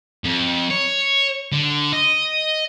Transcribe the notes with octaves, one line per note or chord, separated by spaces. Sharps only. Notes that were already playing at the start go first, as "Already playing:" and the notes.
F2
C#5
D3
D#5